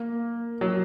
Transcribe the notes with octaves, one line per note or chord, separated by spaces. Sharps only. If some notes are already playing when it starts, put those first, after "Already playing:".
Already playing: A#3
F#3